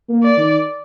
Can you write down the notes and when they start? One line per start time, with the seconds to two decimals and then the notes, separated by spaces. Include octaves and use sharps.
0.09 A#3
0.23 D5
0.37 D#3